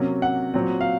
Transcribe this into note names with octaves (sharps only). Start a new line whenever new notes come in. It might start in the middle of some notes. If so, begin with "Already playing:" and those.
Already playing: C3 F#3 A#3 C#4
F#5
A#2 F#3 C4
F5